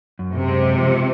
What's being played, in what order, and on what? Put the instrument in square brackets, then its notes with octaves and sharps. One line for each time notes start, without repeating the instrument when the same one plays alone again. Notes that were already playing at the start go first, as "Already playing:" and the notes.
[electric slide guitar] F#2
[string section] C3
[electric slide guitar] G#3
F3